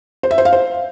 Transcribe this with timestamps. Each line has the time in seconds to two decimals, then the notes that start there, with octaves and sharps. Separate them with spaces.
0.23 C5
0.31 E5
0.38 C5
0.45 F5
0.53 C5